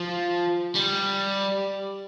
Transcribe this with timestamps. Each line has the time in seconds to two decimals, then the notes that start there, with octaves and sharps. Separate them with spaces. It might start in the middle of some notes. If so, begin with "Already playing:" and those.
Already playing: F3
0.75 G3